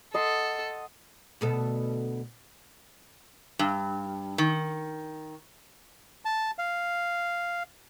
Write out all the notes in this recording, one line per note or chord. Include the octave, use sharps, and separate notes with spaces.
A4 D#5 F#5 C6
D2 B2 A4
G2
D#3
A5
F5